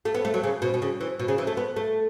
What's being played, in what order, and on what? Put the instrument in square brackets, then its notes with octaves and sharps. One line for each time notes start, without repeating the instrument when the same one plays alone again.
[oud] A3
B3
A3
F#3
C#3
B2
B2
C#3
E3
B2
C#3
E3
A3
B3
A3